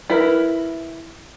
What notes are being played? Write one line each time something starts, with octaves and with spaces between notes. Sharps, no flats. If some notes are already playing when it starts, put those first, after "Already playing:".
E4 A#4 B4